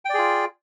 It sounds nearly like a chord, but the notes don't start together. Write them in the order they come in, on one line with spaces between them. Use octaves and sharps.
G5 D5 G#4 F4